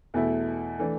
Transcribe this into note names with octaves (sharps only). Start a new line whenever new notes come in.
E2 B2 A3 E4
E3 A3 D4